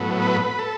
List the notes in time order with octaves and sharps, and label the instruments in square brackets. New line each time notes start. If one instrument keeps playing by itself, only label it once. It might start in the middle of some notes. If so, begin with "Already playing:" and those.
Already playing: [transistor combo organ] A2 F#3 B3
B4
A4